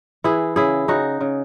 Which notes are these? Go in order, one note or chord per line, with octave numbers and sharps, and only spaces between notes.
E3 E4 G#4
C#3 E4 G#4
C#3 D#4 F#4
C#3